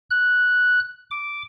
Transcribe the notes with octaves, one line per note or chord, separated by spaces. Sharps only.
F#6
D6